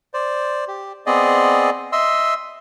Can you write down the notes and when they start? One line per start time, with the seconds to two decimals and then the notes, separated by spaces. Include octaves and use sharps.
0.14 C5 D5
0.68 G4
1.06 B3 C4 G#4 D5 D#5
1.92 D#5 E5 C6 E6